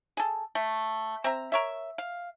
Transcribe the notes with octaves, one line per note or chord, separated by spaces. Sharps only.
G#4 A4
A3
C4 E5 A#5
A#4 C#5 E5
F5